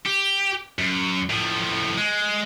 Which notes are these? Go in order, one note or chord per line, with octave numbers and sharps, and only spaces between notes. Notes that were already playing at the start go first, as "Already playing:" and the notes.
G4
F#2
A2 F3
G#3